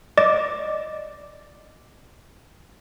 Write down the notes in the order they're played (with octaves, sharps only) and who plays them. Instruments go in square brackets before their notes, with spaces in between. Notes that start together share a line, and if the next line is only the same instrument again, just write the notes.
[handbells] D5 D#5 D6 A6